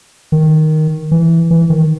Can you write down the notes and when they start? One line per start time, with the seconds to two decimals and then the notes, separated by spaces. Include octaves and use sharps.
0.32 D#3
1.11 E3
1.51 E3
1.70 D#3